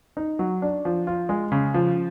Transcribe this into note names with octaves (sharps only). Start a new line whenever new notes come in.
D#4
F#3
D4
F3
F4
G#3
C#3
F3